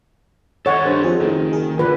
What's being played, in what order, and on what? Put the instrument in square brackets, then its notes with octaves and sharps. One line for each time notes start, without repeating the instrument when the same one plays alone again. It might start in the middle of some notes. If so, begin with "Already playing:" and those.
[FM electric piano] D#3 A6 [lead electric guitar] A4 D#5 [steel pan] C#5 F#5
[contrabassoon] G2 [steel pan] C5
[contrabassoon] F2 [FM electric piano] G#4 A4
[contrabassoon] F#1 [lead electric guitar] D#3
[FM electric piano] G#4 A#4
[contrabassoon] A#2 [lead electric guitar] D3 [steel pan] B4